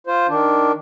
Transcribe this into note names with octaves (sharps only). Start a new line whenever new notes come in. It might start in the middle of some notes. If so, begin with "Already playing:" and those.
F4 C5
D#3 D4